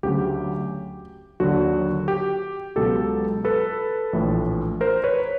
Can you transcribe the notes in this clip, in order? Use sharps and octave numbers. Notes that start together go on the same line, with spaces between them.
D2 C#3 F#3 G4
D#2 D3 F#3 F#4
G4
C#2 B2 F#3 G4 A4
A4 B4
A#1 A2 E3
A#4 C5
B4 C#5